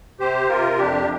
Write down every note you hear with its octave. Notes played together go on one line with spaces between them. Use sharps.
C3 G4 C5
C3 F4 A#4
F2 D4 G4